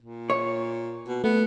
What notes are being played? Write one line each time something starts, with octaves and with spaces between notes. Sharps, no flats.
A#2
C#5
B2
A3 B3